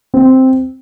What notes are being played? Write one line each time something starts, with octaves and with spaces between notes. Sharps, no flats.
C4